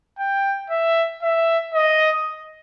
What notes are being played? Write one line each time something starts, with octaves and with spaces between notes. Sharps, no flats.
G5
E5
E5
D#5